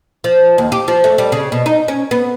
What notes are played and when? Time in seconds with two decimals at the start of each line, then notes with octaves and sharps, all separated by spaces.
0.24 F3
0.58 D#2
0.72 G4
0.88 F3
1.04 A3
1.18 G3
1.32 C#3
1.52 B2
1.66 D#4
1.88 C#4
2.11 B3